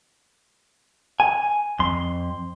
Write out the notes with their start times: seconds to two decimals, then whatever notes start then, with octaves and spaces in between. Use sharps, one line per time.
1.20 G#5
1.79 F2 C6